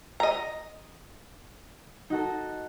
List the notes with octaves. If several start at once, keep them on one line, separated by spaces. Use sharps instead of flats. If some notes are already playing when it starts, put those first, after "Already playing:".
D#5 A#5
D#4 F#4 A4